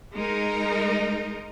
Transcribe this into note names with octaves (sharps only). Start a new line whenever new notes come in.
G#3 D#4 A#4